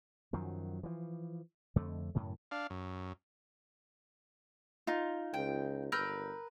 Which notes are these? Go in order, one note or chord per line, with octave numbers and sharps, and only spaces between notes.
F#2 D#3 F3 F#3
E3 F3
F2 D3 A3
F#2 A2 C#3
D4 F5
F#2
D#4 F4
C#2 G5
G1 A#4 B4 E6 G6